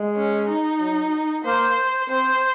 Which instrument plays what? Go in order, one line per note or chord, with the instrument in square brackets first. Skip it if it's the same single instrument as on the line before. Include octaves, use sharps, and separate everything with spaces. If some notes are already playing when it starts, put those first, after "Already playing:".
Already playing: [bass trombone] G#3
[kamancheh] C#4
D#4
[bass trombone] F#3
[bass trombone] A#3 [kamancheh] C5
[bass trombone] C4 [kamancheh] C5